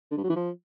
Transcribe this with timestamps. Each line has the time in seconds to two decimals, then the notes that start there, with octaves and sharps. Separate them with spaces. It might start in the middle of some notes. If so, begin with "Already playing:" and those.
0.11 D3
0.17 G2
0.23 F#3
0.30 E3
0.36 F3